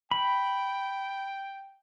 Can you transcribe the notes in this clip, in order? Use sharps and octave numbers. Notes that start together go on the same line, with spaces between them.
G5 B5